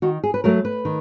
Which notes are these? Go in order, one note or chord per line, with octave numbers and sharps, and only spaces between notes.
D#3 F#4
G#4
B4
F#3 A3 A#4
B4
D#3